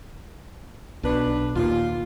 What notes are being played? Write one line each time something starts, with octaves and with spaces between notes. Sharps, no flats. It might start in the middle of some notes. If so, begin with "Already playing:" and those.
B1 B2 D4 B4
D#2 A#2 F4